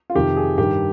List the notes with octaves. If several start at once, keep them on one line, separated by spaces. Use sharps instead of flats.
F4
F2 C3 D#3 G4
G#4
G2 D#3 G4